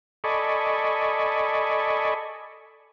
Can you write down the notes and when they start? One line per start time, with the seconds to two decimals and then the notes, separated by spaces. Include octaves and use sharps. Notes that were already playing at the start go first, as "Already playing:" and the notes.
0.24 A4 D5 D#5 G#5 B5 C#6